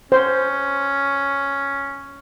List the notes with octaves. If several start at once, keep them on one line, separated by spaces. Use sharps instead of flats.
C#4 C5